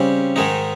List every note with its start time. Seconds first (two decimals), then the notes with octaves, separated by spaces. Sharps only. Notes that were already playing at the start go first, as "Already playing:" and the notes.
Already playing: C#3 G3 C4 G4
0.36 G#2 D#3 G#3 D#4